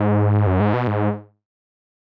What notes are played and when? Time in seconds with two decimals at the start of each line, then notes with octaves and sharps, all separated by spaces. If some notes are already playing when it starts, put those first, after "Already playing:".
Already playing: G#2
0.47 F#2
0.60 G#2
0.74 B2
0.87 G#2